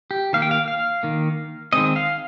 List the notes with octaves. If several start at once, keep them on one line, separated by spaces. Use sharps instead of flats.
G4
D#3 A#3 F5
G5
F5
F5
D#3 A#3
D#3 G#3 C4 D#5
F5